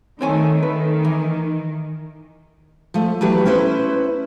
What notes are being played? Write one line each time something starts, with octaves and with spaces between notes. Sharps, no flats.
D#3 A3 C4 C#5 G#5
D#3 B4
E3
F3 A3
E3 F#3 A3 G4 B4
C#4 E4 B4 C5